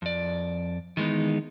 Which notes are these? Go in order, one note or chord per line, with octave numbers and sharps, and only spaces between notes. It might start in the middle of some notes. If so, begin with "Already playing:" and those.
F2 D5
D#3 E3 G#3 B3 D#4